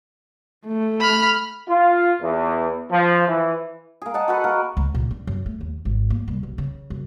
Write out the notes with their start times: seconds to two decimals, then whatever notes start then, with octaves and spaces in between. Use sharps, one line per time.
0.67 A3
1.01 B5 F6
1.68 F4
2.21 E2
2.91 F3
3.27 E3
4.02 A#3 G#4
4.14 D#5 F#5 A5
4.28 F#4 A4 B4
4.44 A#3 F#4 A#4
4.77 C#2
4.94 A#2
5.11 D4
5.27 F#2
5.46 A3
5.61 D#2
5.85 G#1
6.10 A#3
6.28 C2
6.43 B1
6.58 C#3
6.90 F#2